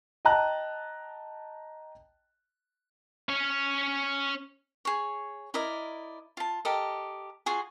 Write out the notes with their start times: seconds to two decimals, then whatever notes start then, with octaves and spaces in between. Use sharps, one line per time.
0.25 D#5 G5 A5 A#5 F#6
3.29 C#4 C#5
4.85 G#4 C#5
5.54 E4 A#4 D5 D#5
6.37 F4 A5
6.65 G4 A4 A#4 D#5
7.46 F4 F#4 G#4 G#5